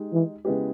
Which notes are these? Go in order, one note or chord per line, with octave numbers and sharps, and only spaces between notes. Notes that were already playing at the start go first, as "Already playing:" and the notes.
Already playing: G#3 D#4 G4
E3
C#3 G#3 B3 E4 G4